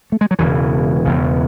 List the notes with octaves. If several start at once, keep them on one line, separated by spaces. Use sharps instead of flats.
A3
G#3
F#3
E1 E2 C#3 E3
E1 E2 C#3